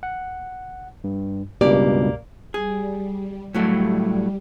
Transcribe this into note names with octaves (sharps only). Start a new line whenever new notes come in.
F#5
G2
C#2 G2 B2 A#3 G4 D5
G3 G#4
A2 F#3 G3 A3